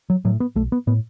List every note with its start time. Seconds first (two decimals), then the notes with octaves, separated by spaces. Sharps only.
0.10 F#3
0.25 A2 F#3
0.40 B3
0.56 B1 A3
0.72 B3
0.87 A2 B3